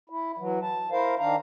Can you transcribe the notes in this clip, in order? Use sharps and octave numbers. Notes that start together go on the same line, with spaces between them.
E4
E3 F#3
A5
E4 A#4 C5 F5
D#3 D4 F5 A#5